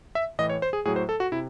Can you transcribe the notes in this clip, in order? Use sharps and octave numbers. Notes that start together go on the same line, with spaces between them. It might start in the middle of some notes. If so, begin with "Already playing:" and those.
E5
A2 E3 D#5
C#5
C5
G#4
A2 F#3 G#4
C5
A4
F#4
C3 E4